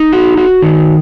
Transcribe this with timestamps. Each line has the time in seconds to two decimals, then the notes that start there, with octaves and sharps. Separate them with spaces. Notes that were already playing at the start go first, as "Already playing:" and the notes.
Already playing: D#4
0.12 F#4
0.37 F#4
0.62 D#3